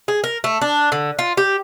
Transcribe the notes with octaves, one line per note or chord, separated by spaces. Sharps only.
G#4
A#4
A3
D4
D3
F4
G4